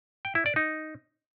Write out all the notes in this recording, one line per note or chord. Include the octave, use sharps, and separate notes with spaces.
G5
E4
D5
D#4